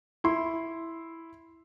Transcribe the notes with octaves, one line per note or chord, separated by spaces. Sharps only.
E4 C6